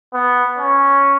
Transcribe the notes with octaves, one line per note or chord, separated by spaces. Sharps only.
B3
C#4